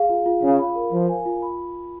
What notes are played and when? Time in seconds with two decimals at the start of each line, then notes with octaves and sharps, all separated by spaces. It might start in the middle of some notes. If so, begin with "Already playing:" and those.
Already playing: G#4 F5
0.09 F4
0.26 F4
0.42 C#3 F5
0.59 B5
0.76 A#4
0.92 F3 F5
1.09 G#5
1.26 F4
1.42 B5